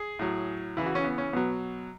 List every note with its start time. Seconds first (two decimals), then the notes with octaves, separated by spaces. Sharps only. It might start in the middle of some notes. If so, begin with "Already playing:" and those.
Already playing: G#4
0.19 A2 F#3
0.77 C#3 E3 E4
0.86 F#4
0.95 C#4
1.04 B3
1.18 C#4
1.33 B2 F#3 B3